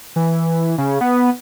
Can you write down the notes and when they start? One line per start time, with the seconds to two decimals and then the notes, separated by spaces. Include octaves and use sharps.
0.16 E3
0.78 C#3
1.01 B3